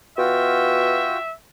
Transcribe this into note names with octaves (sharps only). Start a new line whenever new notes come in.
B2 F4 F#4 E5 G5